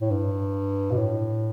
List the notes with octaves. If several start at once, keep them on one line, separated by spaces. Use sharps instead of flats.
A2
G2
B2
A2